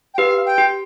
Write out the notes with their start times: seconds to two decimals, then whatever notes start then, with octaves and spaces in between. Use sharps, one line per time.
0.14 G5
0.18 G4 B4 F5
0.46 G5
0.58 G4